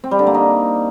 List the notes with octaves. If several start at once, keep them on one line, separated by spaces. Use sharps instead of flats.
C4
G3
D3
A#3
D#4